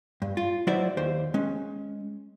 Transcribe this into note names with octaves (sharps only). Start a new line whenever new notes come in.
G2
F4
F#3 D#4 E4 C5 D5 E5
D#2 G4 C5
G#3 C#4